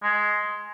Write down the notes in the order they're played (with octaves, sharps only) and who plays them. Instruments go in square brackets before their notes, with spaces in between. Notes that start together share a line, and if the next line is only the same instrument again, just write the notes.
[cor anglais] G#3